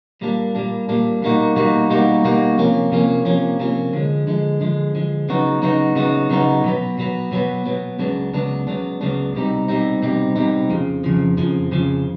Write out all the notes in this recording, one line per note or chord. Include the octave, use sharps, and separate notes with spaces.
A#2 G3 A#3 D4
A#2 G3 A#3 D4
A#2 G3 A#3 D4
B2 G3 A#3 D#4 F#4
B2 G3 A#3 D#4 F#4
B2 G3 A#3 D#4 F#4
B2 G3 A#3 D#4 F#4
C3 F3 A#3 C#4
C3 F3 A#3 C#4
C3 F3 A#3 C#4
C3 F3 A#3 C#4
D3 F3 G#3
D3 F3 G#3
D3 F3 G#3
D3 F3 G#3
C#3 F#3 B3 D#4 F#4
C#3 F#3 B3 D#4 F#4
C#3 F#3 B3 D#4 F#4
C#3 F#3 B3 D#4 F#4
B2 F#3 B3
B2 F#3 B3
B2 F#3 B3
B2 F#3 B3
C#2 C#3 F#3 B3 D4
C#2 C#3 F#3 B3 D4
C#2 C#3 F#3 B3 D4
C#2 C#3 F#3 B3 D4
C2 B2 G3 C4 D#4
C2 B2 G3 C4 D#4
C2 B2 G3 C4 D#4
C2 B2 G3 C4 D#4
F2 C#3 F3
F2 C#3 F3
F2 C#3 F3
F2 C#3 F3